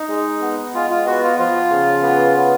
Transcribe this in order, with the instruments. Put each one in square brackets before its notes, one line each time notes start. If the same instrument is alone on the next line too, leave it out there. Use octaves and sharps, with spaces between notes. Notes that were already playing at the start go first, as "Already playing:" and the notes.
Already playing: [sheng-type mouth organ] D#4
[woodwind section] G#3
B3
[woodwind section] G#3 [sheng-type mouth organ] F4
[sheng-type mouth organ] F4
[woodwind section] B3 [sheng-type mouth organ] F#4
[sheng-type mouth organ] F4
[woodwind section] F3 [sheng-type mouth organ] F4
[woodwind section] C#3
B3
B3